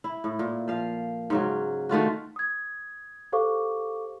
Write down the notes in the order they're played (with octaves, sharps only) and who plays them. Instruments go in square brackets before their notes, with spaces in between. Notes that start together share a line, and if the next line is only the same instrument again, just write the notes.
[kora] E4
A2
A#2
F3 F5
G#2 C#3 F#3
D#3 A3 F4 F#4
[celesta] D#6 G#6
G4 A4 C5 F5 C#6 D6